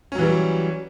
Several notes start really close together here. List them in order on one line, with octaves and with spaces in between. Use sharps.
C#4 F#3 E3 G3